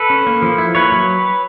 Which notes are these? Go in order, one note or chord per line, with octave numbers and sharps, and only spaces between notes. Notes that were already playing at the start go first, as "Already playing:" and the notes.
Already playing: A4 B4
C#4
A#3
F3
E4
A#3 B4 C#5
F#3